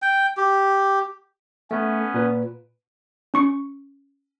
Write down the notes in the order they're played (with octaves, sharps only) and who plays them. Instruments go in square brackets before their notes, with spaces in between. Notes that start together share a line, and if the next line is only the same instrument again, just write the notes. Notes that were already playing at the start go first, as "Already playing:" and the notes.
[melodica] G5
G4
[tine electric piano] A3 [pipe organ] B3 C#4
[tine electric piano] A#2 B4
[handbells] C#4 C#6 C#7